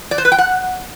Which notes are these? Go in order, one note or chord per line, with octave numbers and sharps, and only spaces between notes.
D5
C5
B4
G5
F#5